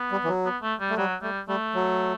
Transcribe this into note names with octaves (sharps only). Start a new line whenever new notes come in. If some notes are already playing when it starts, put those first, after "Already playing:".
Already playing: B3
G3
E3
F#3
B3
A3
G3
A3
F#3 G3
G3 A3
G3 A3
F#3